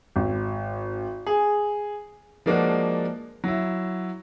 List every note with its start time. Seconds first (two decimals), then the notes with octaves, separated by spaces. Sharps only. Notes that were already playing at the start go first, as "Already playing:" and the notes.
0.16 G#1
1.27 G#4
2.46 F3 G#3 A#3 D4 F#4
3.44 F#3 E4